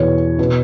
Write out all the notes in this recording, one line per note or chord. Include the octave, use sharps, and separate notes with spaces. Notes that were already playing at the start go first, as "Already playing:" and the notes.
Already playing: E2 B2 C#5
B2